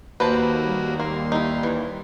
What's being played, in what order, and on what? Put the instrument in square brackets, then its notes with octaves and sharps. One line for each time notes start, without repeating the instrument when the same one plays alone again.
[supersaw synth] D#2 [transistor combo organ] A#3 F#4 [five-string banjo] B4 C5 A5
[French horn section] G3
[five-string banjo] A#3 [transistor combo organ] C6
[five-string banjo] D#4 E4
E3